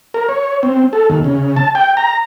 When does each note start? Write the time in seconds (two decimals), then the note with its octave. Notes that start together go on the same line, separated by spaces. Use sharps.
0.14 A#4
0.29 C#5
0.63 C4
0.93 A4
1.10 D#2
1.24 C#3
1.56 A5
1.75 G5
1.97 A#5